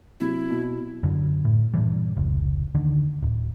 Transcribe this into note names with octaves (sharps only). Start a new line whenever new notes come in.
C3 F#3 E4
B2
F#2 D3
A2
G2 A#2 E3 G3
F1 C#2
D2 D3 D#3
D1